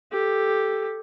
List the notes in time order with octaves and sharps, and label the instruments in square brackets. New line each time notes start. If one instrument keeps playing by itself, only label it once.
[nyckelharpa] G4 A4